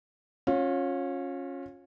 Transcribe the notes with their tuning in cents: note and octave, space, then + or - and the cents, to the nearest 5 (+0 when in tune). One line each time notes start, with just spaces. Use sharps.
C#4 -15 F4 +30